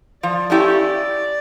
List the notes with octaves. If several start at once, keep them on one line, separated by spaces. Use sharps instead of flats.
F3 D5
A3 C#4 E4 G4